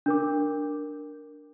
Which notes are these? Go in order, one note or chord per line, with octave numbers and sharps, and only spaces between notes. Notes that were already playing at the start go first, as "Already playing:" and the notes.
D4 A#4 D6